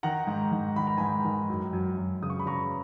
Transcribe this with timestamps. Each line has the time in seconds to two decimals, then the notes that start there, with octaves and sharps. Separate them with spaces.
0.03 D#3 F#5 A#5
0.27 G#2
0.52 G#2
0.76 D#3 B5
0.87 A#5
0.97 G#2 G#5 B5
1.25 D#3
1.49 F#2
1.73 F#2
1.98 F#2
2.22 C#3 D#6
2.30 C#6
2.39 B5
2.46 C#3 A#5 C#6